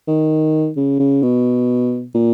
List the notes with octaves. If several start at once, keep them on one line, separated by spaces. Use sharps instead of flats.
D#3
C#3
C#3
B2
A#2